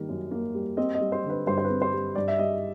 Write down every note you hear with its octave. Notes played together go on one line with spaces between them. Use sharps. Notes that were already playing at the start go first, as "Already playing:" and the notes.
Already playing: D#3 G3 A#3
F#2
A#3
G3
C4 D#5
D#5
G3
C5
D3
B4
G2 C5
C5
B4
C4
C5
G3
G2 D5
E5
G3 D#5